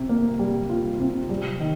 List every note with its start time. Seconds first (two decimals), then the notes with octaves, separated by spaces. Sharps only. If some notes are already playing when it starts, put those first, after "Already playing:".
Already playing: C3
0.09 A#3
0.39 G3
0.70 F4
1.00 C3
1.29 G3
1.60 D#3